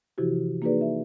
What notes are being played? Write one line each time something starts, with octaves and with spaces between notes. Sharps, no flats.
C3 E3 F3 E4 F#4 G4
A#3 D#4 F#4 G#4 B4 D5
E5